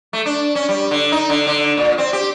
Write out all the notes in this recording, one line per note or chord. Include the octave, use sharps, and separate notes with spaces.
A3
D4
C#4
G3
D3
D#4
D3
D3
A#2
C4
G4